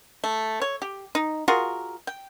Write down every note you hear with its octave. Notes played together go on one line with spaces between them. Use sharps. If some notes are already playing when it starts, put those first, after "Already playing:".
A3
C#5
G4
D#4
F4 F#4 G#4 A#4
G5